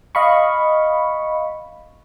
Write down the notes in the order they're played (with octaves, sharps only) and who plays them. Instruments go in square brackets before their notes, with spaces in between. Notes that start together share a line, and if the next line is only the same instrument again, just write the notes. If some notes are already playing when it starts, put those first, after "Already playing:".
[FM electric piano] D#5 F5 B5 C#6